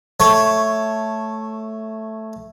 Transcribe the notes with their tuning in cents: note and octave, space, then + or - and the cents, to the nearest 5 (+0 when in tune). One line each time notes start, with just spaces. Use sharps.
A3 +0 C#5 +0